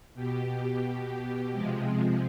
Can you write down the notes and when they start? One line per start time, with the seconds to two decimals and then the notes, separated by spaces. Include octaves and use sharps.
0.15 B2 G4
1.52 C3 F3 G#3